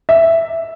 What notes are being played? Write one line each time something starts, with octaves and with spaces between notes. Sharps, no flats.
E5